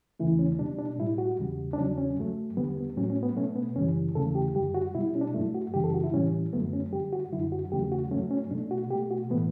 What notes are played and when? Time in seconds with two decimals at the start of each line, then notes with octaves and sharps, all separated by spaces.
0.20 E2 C#3 E3 A3 E4
0.39 C#4
0.59 B2 G3 D4
0.78 D4
0.98 A2 G3 E4
1.18 F#4
1.39 E2 C#3 G3
1.73 D4
1.78 E2 C#3 F#3 C#4
1.98 C#4
2.18 G2 F#3 A3
2.57 E2 D3 G3 B3
2.77 B3
2.97 A2 F#3 A3 C#4
3.10 C#4
3.23 B3
3.36 B2 A3 C#4
3.56 B3
3.76 F#2 C#3 E3 G3 C#4
4.15 E2 C#3 E3 A3 A4
4.35 G4
4.55 F#2 D3 G3 G4
4.74 F#4
4.95 B2 G3 E4
5.08 E4
5.15 C#4
5.21 D4
5.34 G2 F#3 A3 E4
5.54 F#4
5.74 F#2 C#3 E3 G3 G4
5.84 A4
5.94 F#4
6.04 E4
6.14 A2 E3 G3 C#4
6.53 F#2 D3 F#3 A3 B3
6.73 C#4
6.93 G2 D3 G3 G4
7.13 F#4
7.32 F#2 D3 F#3 E4
7.52 F#4
7.72 E2 C#3 F#3 A3 G4
7.92 F#4
8.11 A3 C#4
8.14 G2 F#3
8.31 C#4
8.51 B2 A3 D4
8.71 F#4
8.90 B2 G4
8.95 A3
9.11 F#4
9.30 A2 E3 A3 B3